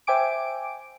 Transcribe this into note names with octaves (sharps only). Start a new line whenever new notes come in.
C5 E5 G5 G#5 D6 D7